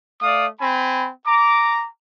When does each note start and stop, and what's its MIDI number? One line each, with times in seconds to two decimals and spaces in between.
0.22 0.47 57
0.22 0.47 74
0.22 0.47 77
0.22 0.47 87
0.61 1.09 60
0.61 1.09 80
0.61 1.09 83
1.27 1.87 82
1.27 1.87 86